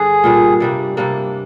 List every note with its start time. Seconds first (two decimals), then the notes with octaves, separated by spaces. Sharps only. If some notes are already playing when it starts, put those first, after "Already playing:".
Already playing: G2 D3 D4 G#4
0.24 A#2 G3 D4
0.60 C3 G3 A#3 D4
0.97 C3 G3 A#3 D4